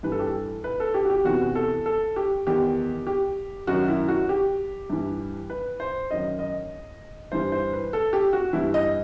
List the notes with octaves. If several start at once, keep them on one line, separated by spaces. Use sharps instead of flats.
G2 E3 B4
A4
G4
A4
B4
A4
G4
F#4
G4
E2 C3 E3 F#4
A4
A4
G4
E2 D#3 G4
G4
F#2 D#3 F#4
E4
F#4
G4
G2 E3
B4
C5
F#2 D#3 D#5
D#5
G2 E3 C5
C5
B4
A4
G4
F#4
G2 E3 E4
D#5